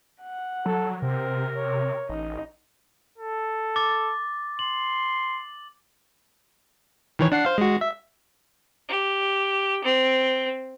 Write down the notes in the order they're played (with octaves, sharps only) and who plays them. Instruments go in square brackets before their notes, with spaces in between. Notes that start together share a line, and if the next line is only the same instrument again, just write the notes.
[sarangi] F#5
[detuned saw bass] F#3 [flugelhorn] A4
[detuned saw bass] C3 [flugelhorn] C4 [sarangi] A#4
[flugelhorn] C#5
[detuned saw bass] A1 [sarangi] D#4
[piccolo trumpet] A4
[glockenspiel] D6 A6
[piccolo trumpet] C6 [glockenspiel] F#7
[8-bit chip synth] D#3 E3 C#5
D4 F#5 C7
C5 F5
G#3 F#4
E5
[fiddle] G4
C4